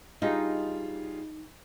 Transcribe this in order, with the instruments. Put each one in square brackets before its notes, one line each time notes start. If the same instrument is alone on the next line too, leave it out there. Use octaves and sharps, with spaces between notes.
[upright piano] G3 F4 G#4 [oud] D#4